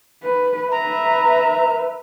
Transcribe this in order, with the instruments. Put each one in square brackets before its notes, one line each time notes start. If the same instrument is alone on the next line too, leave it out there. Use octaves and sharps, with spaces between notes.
[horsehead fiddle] B4
[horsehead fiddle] B4 E5 [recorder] A#5